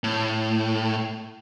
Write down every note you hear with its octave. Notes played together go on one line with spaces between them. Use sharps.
A2